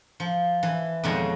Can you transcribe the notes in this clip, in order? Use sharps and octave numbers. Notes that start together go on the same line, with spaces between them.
F3
E3
F2 B2 D#3 G#3 C#5 A5